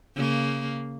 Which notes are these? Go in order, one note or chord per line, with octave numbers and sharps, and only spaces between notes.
C#3 A#3